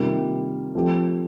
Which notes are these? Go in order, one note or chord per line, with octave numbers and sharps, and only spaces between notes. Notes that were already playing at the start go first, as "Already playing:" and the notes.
Already playing: C3 D#3 G3 A#3 F4
F3 A3 C4 G4